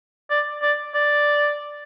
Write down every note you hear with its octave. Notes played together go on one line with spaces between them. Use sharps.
D5
D5
D5